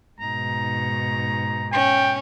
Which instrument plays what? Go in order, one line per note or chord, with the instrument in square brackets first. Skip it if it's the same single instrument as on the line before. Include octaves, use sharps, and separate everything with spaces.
[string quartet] G#2 B2 [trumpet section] D#4 A#5
[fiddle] C#4 [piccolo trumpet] G5